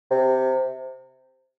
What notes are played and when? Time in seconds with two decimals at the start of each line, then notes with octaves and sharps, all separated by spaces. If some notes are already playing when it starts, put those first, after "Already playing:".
0.11 C3